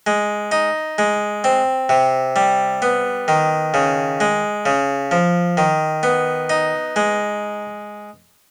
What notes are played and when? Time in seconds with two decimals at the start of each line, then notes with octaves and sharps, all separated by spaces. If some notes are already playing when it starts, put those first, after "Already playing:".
0.07 G#3
0.52 D#4
0.98 G#3
1.44 C4
1.89 C3
2.36 G3
2.82 B3
3.28 D#3
3.74 C#3
4.20 G#3
4.66 C#3
5.11 F3
5.57 D#3
6.03 B3
6.50 D#4
6.96 G#3